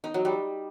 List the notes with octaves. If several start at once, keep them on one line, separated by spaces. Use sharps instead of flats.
D#4
F#3
G3